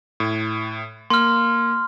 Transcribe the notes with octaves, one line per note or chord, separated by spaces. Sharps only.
A2
A#3 C6 F6